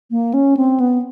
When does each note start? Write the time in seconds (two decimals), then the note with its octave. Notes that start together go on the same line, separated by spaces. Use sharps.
0.11 A#3
0.34 C#4
0.57 C4
0.80 B3